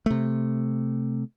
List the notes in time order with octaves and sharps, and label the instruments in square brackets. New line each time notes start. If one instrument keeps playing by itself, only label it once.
[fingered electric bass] C3 A3